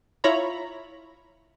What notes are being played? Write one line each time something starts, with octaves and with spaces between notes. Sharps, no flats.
E4 F4 C#5 A#5 B5